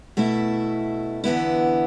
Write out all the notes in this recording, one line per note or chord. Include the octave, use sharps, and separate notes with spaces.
B2 A3 E4
E2 D3 B3 E4